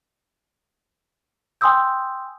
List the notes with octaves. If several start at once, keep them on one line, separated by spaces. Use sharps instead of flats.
G5 G#5 C6 D#6 E6 G6